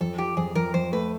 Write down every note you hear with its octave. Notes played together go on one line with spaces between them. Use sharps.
F2 A4
F3 G4
F2 G#4
F2 A#4
F2 C5
A3 B4